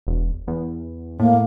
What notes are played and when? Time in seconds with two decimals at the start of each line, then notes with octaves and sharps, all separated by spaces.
0.07 E1
0.47 E2
1.19 A2 A#3